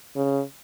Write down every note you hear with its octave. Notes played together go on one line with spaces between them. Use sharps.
C#3